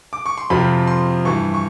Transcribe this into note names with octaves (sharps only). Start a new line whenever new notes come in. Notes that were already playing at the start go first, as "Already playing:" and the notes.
D6
C#6
C6
F2 C3 F3 B5
C6
G2 E3 C#6
C#6